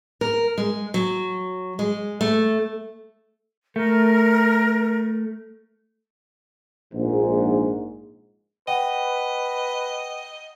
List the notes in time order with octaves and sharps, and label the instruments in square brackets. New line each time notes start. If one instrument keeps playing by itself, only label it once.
[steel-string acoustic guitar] A#4
G#3
F#3
G#3
A3
[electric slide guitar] A3 [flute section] A#4
[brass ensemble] A#1 G#2
[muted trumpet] B4 [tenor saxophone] D#5 [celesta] F#5 G5